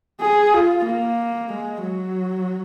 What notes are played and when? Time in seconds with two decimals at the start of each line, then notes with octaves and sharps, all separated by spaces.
0.21 G#4
0.53 F4
0.86 A#3
1.50 G#3
1.82 F#3